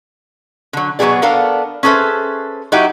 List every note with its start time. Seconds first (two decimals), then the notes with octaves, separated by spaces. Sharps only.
0.73 D3 F#3
0.99 B2 F#3 G#3 B3 G#4 D5
1.22 B3 D4 A4 A#4 F5
1.83 C#4 G#4 A4 B4 C5 E5
2.72 F#3 D#4 E4 F#4 G4